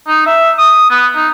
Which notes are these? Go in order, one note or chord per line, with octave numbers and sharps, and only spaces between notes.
D#4
E5
D#6
B3
D#4